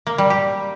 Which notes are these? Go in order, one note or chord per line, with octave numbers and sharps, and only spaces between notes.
A#3
G3
G4